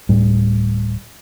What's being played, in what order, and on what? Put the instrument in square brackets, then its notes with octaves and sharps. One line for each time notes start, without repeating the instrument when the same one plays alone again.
[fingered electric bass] D1 A2 G3